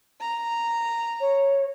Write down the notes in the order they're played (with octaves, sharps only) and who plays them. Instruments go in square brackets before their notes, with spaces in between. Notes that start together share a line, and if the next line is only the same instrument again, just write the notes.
[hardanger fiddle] A#5
[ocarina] C#5